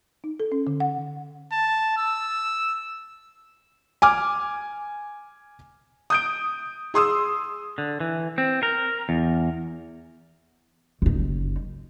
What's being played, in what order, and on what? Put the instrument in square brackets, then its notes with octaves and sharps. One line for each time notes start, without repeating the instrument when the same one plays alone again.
[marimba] D#4
A4
C#4
D3
F#5
[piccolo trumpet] A5
E6
[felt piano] G#5 D6 F6
D#6 G6 D7
G#4 C6 D#6 E6
[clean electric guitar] D3
E3
C4
A#4
E2
[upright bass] F#1 D#4